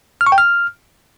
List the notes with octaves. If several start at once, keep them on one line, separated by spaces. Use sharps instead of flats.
F6
C#6
G5
F6